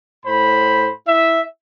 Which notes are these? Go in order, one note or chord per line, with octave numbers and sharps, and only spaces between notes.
A2 C5 B5
E4 E5